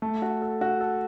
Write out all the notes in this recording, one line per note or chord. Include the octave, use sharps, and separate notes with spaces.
A3
F#4
A4
F#4
A4